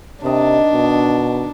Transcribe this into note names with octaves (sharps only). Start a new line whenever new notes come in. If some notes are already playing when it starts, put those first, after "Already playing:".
C3 D#3 D4 D#5 A5
B2